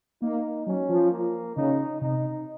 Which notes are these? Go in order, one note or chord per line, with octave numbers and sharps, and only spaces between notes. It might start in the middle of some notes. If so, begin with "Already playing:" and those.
A#3 D#4
F#3 C#4
F3
A#3
C#3 D#4
C3 D#4